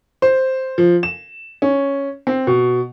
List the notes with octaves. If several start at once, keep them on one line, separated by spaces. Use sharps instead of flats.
C5
F3
E7
C#4
C4
B2